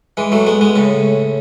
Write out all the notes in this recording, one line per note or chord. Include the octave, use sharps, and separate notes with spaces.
E3 G#3
F#3 A3
G#3 B3
G#3 B3
A2 C#3